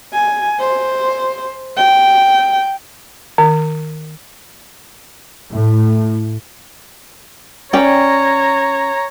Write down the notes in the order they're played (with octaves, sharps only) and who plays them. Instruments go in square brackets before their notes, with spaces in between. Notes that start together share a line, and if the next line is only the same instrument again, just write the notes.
[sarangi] G#5
C5
G5
[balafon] D#3
[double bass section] A2
[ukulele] C#4 D5 G5 [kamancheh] C#5 A#5